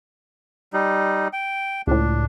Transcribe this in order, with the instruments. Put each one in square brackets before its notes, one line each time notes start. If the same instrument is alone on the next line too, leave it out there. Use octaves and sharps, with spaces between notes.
[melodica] G3 D#4
G5
[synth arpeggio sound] C#2 A2 [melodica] D4